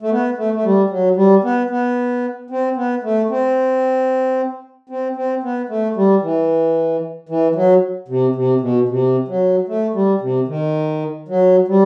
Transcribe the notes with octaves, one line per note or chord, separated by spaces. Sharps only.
A3
B3
A3
A3
G3
F#3
G3
B3
B3
C4
B3
A3
C4
C4
C4
B3
A3
G3
E3
E3
F#3
C3
C3
B2
C3
F#3
A3
G3
C3
D#3
F#3
G3